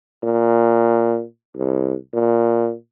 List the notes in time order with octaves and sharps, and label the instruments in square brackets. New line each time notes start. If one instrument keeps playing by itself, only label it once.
[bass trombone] A#2
C2
A#2